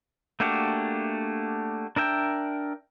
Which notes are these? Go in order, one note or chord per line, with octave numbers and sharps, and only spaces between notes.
A3 A#3 D4 F#4 G4
D4 A#4 E5 G5